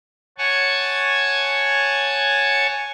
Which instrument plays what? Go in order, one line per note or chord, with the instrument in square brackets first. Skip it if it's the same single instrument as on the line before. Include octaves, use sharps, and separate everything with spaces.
[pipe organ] C#5 F#5 G#5 A5 C#6